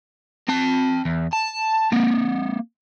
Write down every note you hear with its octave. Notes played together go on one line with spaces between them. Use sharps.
C4 A5
E2
A5
A#3 C4